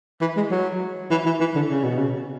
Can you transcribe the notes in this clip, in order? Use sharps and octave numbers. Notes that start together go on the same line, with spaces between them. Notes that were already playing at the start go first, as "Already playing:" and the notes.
E3
G#3
F#3
E3
E3
E3
D3
C#3
B2
C#3